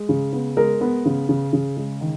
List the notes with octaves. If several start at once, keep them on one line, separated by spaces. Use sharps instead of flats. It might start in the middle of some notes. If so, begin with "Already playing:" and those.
Already playing: G#3
C#3
B3
G#3 A#4
B3
C#3
C#3
C#3
G#3
D#3